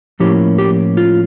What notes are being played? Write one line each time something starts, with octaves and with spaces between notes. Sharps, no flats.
A2 F3 A#3 C#4 E4 G4
G4
F4